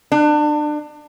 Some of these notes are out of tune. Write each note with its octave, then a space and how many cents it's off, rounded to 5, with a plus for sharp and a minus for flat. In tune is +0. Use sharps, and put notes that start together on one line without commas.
D4 +30